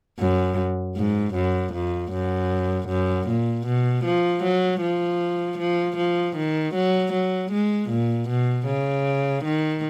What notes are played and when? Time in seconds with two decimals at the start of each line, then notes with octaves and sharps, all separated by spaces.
0.19 F#2
0.96 G#2
1.34 F#2
1.73 F2
2.12 F#2
2.89 F#2
3.28 A#2
3.66 B2
4.05 F3
4.43 F#3
4.81 F3
5.58 F3
5.97 F3
6.36 D#3
6.74 F#3
7.13 F#3
7.51 G#3
7.89 A#2
8.29 B2
8.67 C#3
9.44 D#3